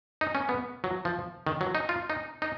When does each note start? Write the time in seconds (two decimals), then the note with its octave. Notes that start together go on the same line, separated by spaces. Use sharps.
0.21 D#4
0.35 C#4
0.49 B3
0.84 F#3
1.05 F3
1.47 D#3
1.61 F#3
1.75 D#4
1.89 F4
2.10 D#4
2.42 D#4